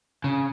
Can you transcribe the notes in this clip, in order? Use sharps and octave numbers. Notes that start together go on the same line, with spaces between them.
C#3